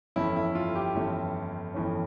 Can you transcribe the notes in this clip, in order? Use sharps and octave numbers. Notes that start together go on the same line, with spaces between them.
G1 F2 E3 A3 C#4 E4
E4
F4
G4
G1 F2 E3 A3 C#4
G1 F2 E3 A3 C#4